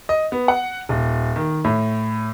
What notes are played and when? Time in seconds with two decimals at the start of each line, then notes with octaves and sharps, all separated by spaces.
0.09 D#5
0.32 B3
0.48 F#5
0.89 D#1
1.36 D#3
1.64 A2